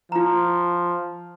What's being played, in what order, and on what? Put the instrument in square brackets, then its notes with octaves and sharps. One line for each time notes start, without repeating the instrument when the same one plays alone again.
[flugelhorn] F3 [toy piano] F4 A#5